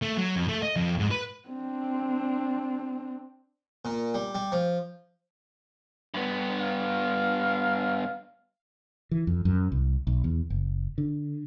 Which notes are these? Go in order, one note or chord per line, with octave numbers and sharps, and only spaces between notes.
A3
F#3
F2
A3
D#5
F2
G#2
B4
C4 D4
A#2
G3
G3
F3
G2 B3
F5
E3
F2
F#2
C2
B1
E2
F#1
D3